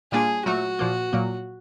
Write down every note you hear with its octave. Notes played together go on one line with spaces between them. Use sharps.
A#2 G3 A#3 D4 F4 G#4
A#2 F#3 A3 F#4
A#2 F3 A#3
A#2 F#3 A#3